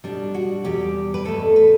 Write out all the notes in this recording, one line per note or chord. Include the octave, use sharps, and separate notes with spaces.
B2 G3 D4
F#4
E2 B2 G3 G4
B4
E2 B2 A3 A4
B4